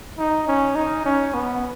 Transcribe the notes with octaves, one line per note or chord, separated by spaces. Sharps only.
D#4
C#4
D#4
C#4
B3